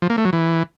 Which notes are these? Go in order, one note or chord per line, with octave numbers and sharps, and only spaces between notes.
F3
A#3
A3
F#3
E3